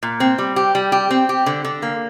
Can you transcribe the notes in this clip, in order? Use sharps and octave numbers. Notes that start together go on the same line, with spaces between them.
A#2
C4
G3
G4
G3
G4
C4
G4
D3
D3
A#3